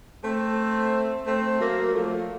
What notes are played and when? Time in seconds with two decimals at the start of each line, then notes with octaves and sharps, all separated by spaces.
0.24 A3 C4
1.26 A3 C4
1.60 F#3 A#3
1.94 F3 A3